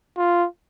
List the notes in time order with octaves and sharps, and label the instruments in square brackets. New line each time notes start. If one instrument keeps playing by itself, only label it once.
[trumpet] F4